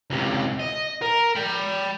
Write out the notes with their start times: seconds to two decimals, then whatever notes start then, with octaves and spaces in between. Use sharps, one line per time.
0.10 C#2 C3
0.59 D#5
1.02 A#4
1.36 G5 B5